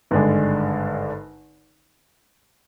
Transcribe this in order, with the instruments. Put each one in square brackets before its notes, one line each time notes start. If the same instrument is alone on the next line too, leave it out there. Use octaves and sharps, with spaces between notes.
[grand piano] G#1 G2 D3 G#3 D4